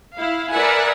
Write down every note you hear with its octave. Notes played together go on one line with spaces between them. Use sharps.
E4 F5
A#4 B4 D5 E5 F#5 G#5